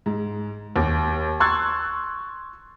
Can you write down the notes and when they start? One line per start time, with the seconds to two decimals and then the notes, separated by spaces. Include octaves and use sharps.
0.06 G#2
0.76 D#2
1.40 C6 C#6 E6 F#6 G#6 A6